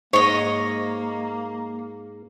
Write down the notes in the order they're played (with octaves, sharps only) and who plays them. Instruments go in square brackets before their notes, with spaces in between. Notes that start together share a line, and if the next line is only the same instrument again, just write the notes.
[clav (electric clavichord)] G#2 [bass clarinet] A#3 [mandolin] C#5 D#5